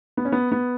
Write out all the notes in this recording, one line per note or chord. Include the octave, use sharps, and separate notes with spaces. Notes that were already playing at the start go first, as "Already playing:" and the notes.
B3
C#4
B3
B3